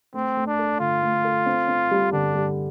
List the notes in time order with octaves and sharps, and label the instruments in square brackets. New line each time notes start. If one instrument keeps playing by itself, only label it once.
[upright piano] A3 [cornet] C4
[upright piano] A3
[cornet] D4
[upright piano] A4
[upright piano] D3 [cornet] F4
[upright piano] A3
A4
C4
C4
G3
[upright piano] D3 [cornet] D4
[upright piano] G3